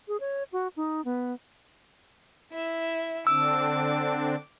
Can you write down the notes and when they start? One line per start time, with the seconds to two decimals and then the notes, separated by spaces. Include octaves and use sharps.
0.08 G#4
0.20 C#5
0.52 F#4
0.76 D#4
1.05 B3
2.51 E4 E5
3.27 D3 C4 D4 D6 E6